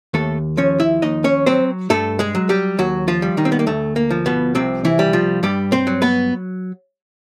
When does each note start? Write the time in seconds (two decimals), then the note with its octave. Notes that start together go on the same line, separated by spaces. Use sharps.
0.14 D#2 A3 A4
0.57 F3 C#4 C#5
0.80 E4 E5
1.02 D#2 D#4 D#5
1.24 C#4 C#5
1.46 F#3 C4 C5
1.90 G2 A3 A4
2.19 G#3 G#4
2.35 F#3
2.49 G3 G4
2.79 D#2 F#3 F#4
3.08 F3 F4
3.22 G3
3.37 D#3 D#4
3.45 C4
3.52 B3
3.59 A#3
3.67 D2 A3
3.96 A#3
4.11 F3
4.26 B2 B3
4.55 C2 C3 C4
4.85 E3 E4
4.99 G3
5.13 F3 F4
5.43 G2 G3 G4
5.72 C4 C5
5.87 F#3
6.02 B3 B4